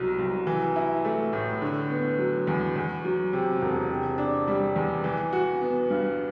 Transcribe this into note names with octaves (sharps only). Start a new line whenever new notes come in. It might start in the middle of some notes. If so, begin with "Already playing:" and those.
Already playing: C2 B2 F#3
C2
E3
E4
A3
A2
D3
B3
F#3
E2
E2
F#3
C3
E1
C3
D4
G3
E2
E3
F#4
B3
G2